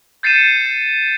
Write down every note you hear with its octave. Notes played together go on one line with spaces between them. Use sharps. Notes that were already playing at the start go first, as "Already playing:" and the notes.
G6 A6 C7 C#7 D#7 E7